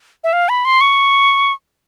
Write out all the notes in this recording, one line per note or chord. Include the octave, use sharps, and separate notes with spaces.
E5
F5
B5
C6
C#6